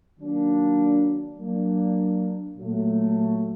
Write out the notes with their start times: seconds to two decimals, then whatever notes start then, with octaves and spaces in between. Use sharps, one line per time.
0.19 D#3 F#3 A#3 D4
1.38 F#3 A#3 D4
2.57 A#2 F#3 A3